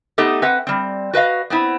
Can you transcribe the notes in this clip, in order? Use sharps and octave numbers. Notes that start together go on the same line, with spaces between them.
A3 B3 D#4 G4 A4
C4 B4 E5 F#5
G3 C4
F#4 B4 D#5 F5
B3 C4 E4